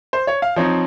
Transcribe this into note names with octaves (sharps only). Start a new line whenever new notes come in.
C5
C#5
F5
F3 C4 D#4 C#5